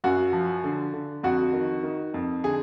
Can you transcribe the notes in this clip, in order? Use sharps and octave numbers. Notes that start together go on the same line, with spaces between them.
F#2 F#4
F3
D3
D3
F2 F#4
D#3
D#3
F2
D3 G#4